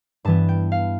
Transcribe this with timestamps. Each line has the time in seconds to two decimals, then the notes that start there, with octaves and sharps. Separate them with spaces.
0.25 G2 E3 B3 A5
0.49 G5
0.72 F5